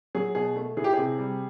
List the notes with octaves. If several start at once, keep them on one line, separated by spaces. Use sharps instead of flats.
F#3 G#4
B2 G#4
A3
E3 G#4
G4
C3 G#4
G3